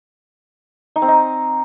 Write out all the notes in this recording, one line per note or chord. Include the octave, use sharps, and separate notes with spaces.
D#4
C4
D#4